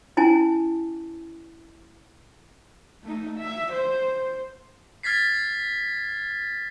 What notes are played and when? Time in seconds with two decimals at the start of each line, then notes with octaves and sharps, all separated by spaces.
0.17 C#4 E4 G#5 A5
3.03 A3 D#4
3.39 E5
3.72 C5
5.03 F6 G#6 A6 B6 C7